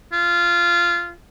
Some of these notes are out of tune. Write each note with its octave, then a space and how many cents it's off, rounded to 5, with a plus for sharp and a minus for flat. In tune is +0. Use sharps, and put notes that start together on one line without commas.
F4 -15